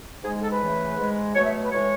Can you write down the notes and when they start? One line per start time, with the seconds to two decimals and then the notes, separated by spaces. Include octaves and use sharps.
0.22 G#2 G#3 G#4
0.41 A4
0.50 B4
0.59 E2 C#3 E3 A3
0.97 G#2 G#3
1.34 B2 F#3 A3 C#5
1.44 E5
1.62 B4
1.71 A2 E3 G#3 C#5